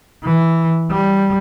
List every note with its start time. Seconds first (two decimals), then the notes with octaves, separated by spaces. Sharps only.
0.24 E3
0.91 G3